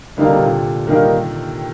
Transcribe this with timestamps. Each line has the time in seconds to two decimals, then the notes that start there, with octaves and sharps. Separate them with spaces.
0.17 D3 G3 A#3 D#4 A#4 F5
0.27 C3
0.37 A#2
0.46 C3
0.87 D#3 G3 A#3 D#4 A#4 F5